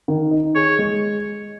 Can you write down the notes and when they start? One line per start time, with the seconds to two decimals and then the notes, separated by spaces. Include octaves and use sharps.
0.08 D#3
0.31 D#4
0.55 G#4 C#5
0.79 G#3